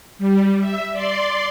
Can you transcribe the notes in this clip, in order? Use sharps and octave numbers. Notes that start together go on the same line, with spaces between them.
G3
E5
D5 C6